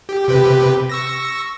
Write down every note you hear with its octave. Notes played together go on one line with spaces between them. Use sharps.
G4
C3 G4 B4
C#6 E6 A#6